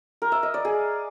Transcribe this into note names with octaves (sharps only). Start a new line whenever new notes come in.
A#4
E5
D#5
D5
G#4